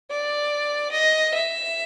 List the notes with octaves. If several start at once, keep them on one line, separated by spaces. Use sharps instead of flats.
D5
D#5
E5